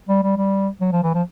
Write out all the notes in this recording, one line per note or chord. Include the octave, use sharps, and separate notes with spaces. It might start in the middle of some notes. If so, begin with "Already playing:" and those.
G3
G3
G3
F#3
F3
E3
F3